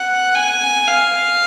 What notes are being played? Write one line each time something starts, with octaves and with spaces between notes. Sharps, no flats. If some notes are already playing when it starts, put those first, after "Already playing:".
Already playing: F#5
G#5
F5